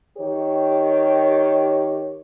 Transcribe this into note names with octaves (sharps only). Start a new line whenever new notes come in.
D#3 G4 C#5